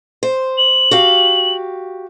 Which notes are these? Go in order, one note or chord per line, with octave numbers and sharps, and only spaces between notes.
C5
F#7
F#4 G4 F5